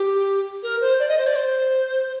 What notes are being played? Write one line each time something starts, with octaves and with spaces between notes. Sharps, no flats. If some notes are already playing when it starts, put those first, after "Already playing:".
Already playing: G4
A#4
C5
D5
D#5
C5
D5
C5